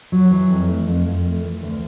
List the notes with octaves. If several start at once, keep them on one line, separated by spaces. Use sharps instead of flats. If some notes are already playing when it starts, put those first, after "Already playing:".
F#3
E3
F2
A3
F2
F2
A3
E3
D2